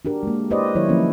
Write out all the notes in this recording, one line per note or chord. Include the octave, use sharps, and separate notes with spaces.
D4 F#4 G4 A#4
G#3 A#3
E4 G4 B4 C5 D5 D#5
D#3 F#3 E4 C#5
F3 A#3 C#4 E4